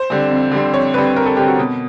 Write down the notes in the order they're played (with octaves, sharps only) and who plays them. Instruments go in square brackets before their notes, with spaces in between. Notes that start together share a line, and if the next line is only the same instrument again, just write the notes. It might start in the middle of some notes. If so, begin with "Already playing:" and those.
Already playing: [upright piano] C5
D3 G3 C4
F2
D3 G3 C4
F2 C#5
D3 G3 C4 B4
F2 A#4
A4
D3 G3 C4 G4
F#4
B2